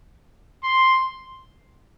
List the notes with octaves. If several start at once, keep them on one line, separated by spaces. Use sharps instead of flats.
C6